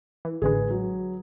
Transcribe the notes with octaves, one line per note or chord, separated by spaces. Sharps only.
E3
A1 D3 G#3 G#4 B4
F#3